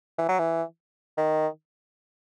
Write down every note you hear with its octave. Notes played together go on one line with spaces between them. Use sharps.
E3
F#3
E3
D#3